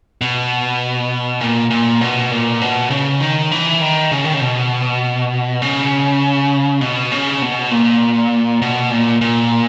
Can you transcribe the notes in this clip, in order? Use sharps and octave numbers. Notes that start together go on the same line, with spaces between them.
B2
A#2
A#2
B2
A#2
B2
C#3
D#3
E3
D#3
C#3
D#3
C#3
B2
C#3
B2
C#3
B2
A#2
B2
A#2
A#2